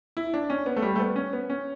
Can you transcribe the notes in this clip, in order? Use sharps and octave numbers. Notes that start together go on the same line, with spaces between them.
E4
D4
C#4
B3
A3
G3
A3
B3
C#4
B3
C#4